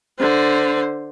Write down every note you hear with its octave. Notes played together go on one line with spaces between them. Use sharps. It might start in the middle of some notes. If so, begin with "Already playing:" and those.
D3 C5